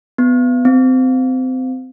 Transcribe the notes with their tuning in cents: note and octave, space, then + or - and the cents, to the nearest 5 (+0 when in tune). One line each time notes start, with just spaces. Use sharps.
B3 +15
C4 -25